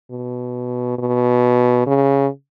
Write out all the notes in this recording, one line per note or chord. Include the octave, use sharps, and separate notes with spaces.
B2
B2
C#3